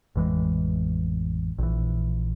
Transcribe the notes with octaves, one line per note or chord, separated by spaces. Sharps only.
A1 F2 E3 G#3
A#1 E3